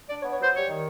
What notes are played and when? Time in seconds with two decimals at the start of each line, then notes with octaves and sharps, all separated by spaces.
0.09 D4 D5
0.21 C#5
0.25 B3
0.32 C#5
0.39 F#3 C5
0.54 G3 C#5
0.68 D#3